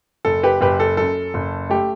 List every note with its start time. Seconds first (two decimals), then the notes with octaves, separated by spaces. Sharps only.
0.25 F#1 A4
0.43 G4 B4
0.61 F#1 G4 B4
0.80 A4
0.97 F#2 A4
1.34 F#1
1.70 A3 G4